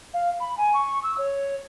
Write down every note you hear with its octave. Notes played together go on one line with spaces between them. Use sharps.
F5
B5
G#5
C#6
E6
C#5